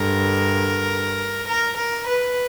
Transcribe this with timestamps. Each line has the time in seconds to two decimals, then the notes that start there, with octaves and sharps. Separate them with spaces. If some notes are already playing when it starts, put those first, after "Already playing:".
Already playing: G2 D3 A#4
1.50 A#4
1.79 A#4
2.08 B4